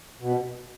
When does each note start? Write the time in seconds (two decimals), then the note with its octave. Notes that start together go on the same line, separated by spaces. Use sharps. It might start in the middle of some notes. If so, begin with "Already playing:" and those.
0.20 B2